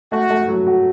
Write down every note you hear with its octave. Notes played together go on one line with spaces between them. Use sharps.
A3 F#4
A3
F#3
F#4